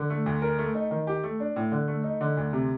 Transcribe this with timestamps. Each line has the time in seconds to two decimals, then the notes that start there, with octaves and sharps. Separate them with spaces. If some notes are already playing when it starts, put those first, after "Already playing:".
Already playing: D3
0.10 A3
0.26 D2
0.42 A#4
0.59 A3
0.75 D#4
0.91 D#3
1.07 G4
1.24 A3
1.40 D4
1.56 A2
1.72 D3
1.88 A3
2.04 D#4
2.21 D3
2.37 D2
2.53 C3